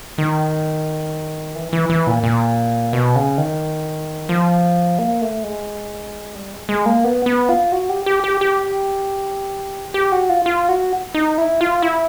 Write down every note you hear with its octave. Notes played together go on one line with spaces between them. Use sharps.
D#3
E3
E3
E3
A#2
A#2
B2
C#3
D#3
F3
A#3
A3
G#3
G3
G#3
G#3
A#3
B3
B3
F4
F#4
G4
G4
G4
G4
G4
F#4
F4
F4
F#4
D#4
E4
F4
E4